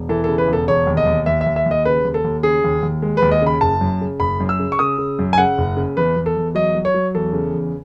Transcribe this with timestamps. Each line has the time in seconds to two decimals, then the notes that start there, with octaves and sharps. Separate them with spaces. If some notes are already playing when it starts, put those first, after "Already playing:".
Already playing: E1
0.09 E3 A4
0.24 C#3 A4
0.38 B4
0.48 E1 A4
0.68 E1 C#5
0.87 D#2
0.97 D#5
1.06 D#2
1.26 D#2 E5
1.41 E5
1.46 D#2
1.56 E5
1.66 D#2
1.71 D#5
1.85 C#3 B4
2.05 D#2
2.14 A4
2.24 D#2
2.43 C#3 G#4
2.64 D#2
2.83 D#2
3.02 G#3
3.17 B4
3.22 D#2
3.31 D#5
3.42 C#3 B5
3.61 F#1 A5
3.81 F#2
4.01 C#3
4.20 F#1 B5
4.40 F#2
4.49 E6
4.59 C#3
4.72 C#6
4.79 C#3 D#6
4.98 C#3
5.19 F#2
5.33 G#5
5.38 C#3 F#5
5.58 F#1
5.77 C#3
5.97 E2 B4
6.16 E2
6.26 A4
6.36 E2
6.55 F#3 D#5
6.75 F#3
6.85 C#5
6.94 F#3
7.15 E2 A4
7.33 C#3
7.53 E2